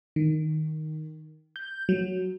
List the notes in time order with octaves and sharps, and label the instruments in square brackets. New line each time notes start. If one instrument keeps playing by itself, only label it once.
[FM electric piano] D#3
G6
F#3